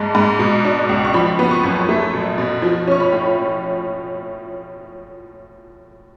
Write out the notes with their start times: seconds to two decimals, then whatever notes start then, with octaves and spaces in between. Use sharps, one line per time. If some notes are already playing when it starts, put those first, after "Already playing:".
Already playing: G#2 G#3 A5
0.15 G#2
0.39 B2
0.64 D4
0.89 C#2
1.05 C#6
1.14 F3 B5
1.39 B3
1.51 C#6
1.63 F#2
1.89 A3
2.13 B2
2.38 B2
2.62 F3
2.87 C#4 C#6
3.00 B5
3.12 A2